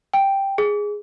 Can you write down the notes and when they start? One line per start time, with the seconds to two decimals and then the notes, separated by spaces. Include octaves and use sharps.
0.14 G5
0.58 G#4